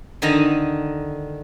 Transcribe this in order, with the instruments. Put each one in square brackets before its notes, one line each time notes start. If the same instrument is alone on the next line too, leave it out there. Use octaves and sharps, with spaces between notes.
[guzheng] D3 D#3 D#4 D#5 A#5